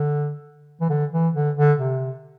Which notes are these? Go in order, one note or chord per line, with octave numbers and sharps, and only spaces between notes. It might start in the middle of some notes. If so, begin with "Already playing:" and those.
Already playing: D3
E3
D3
E3
D3
D3
C3